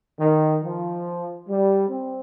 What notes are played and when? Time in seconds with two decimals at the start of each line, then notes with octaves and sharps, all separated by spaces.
0.20 D#3
0.63 F3
1.48 G3
1.89 C4